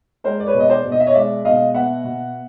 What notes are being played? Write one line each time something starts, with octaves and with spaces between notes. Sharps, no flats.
G#3 A#4 C5
D5
B4 C#5
B2
D#5
C5 D5
B2
D#5
E5
C#5 D#5
G#3 D5 E5
B2 D#5 F5
B3 E5 F#5
B2